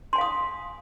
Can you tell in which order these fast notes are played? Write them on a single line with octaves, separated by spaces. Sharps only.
C6 G#5 F5 D#6